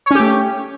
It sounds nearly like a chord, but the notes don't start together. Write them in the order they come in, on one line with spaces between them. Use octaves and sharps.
C#5 C#4 G4 A3